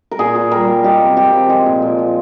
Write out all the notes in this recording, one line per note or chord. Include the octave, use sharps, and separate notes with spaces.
A#4
A#2 G#4
A#2
G3 A#4
G3
G#3 G4
C3
C3 G4
F3
G#3 G#4
A#2
A#2
F3